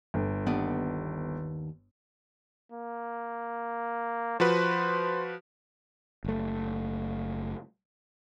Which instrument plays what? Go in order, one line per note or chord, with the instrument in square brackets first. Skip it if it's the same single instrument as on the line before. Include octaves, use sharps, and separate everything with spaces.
[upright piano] G1
[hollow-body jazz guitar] D#2 B3 D4
[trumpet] A#3
[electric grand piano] F3 F#4 B4 [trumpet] C5
[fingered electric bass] F#1 A3